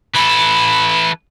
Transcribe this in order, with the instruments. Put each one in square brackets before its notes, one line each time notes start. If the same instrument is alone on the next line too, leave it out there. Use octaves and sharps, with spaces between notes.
[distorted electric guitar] E3 A4 [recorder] B5